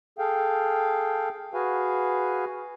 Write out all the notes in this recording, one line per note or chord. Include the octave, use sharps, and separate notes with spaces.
G#4 A4 F5 G5
F#4 G#4 B4 F5 G#5